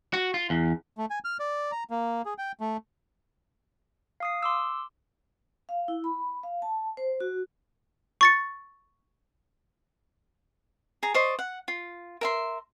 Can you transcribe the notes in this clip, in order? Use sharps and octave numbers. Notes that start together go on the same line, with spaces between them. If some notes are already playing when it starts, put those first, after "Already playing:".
F#4
F4
E2
A3
G#5
F6
D5
A#5
A#3
G#4
G5
A3
F5 D#6 C7
C6 D6 E6
F5
E4
B5
F5
A5
C5
F#4
C#6 A6 C#7
G#4 A#5
C5 D5 D#5 C#6
F#5
F4
A#4 E5 C6